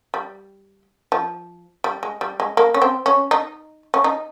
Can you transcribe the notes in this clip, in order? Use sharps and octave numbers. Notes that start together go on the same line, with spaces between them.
G3
F3
G3
G#3
G3
G#3
A#3
C#4
C4
C#4
D#4
C#4
D#4